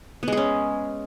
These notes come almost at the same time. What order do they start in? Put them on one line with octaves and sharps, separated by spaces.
B3 G#3 G#4 C#4